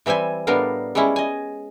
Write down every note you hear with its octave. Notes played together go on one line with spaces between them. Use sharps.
E3 G3 C4 E5 G#5
A2 G3 B3 D4 A#4 F5
G3 G#3 C#4 E4
D#5 G#5